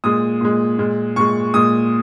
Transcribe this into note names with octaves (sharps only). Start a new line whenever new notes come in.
A#2 G#3 D#6
A#2 G#3
A#2 G#3
A#2 G#3 C#6
A#2 G#3 D#6